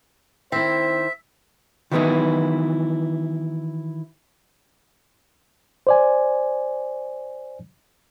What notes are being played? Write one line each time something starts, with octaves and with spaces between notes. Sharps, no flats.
D#3 C4 E4 C5 E5
D#3 E3 F#3 B3 D#4 E4
C5 D5 G#5